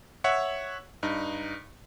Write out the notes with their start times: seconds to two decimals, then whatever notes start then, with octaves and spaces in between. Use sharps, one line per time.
0.24 C#5 E5 F#5
1.03 G2 D#4